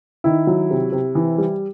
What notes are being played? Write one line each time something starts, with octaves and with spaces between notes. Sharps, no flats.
D#3 E4
F#3
C3
C3
E3
G3